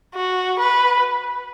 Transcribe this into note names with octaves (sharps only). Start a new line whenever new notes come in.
F#4
B4